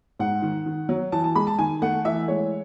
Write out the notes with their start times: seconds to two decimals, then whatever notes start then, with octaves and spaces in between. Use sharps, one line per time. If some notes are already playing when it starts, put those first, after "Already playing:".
0.19 G#2 F#5
0.42 D#3
0.66 D#3
0.89 F#3
1.12 E3 A5
1.24 A5
1.35 G#3 B5
1.47 A5
1.58 D#3 G#5
1.82 A3 F#5
2.05 E3 E5
2.28 G#3 C#5